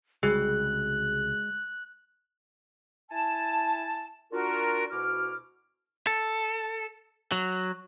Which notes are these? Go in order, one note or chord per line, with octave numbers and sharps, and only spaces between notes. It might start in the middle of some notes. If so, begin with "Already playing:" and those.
C2 C#3 G3 G#3 F#4 G#4 E6 F#6
E4 G#5 A5
D4 F4 F#4 A#4
D2 B2 E4 F#4 D6 F6
A4
F#3